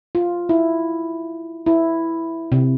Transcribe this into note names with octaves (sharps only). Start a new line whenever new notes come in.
F4
E4
E4
C3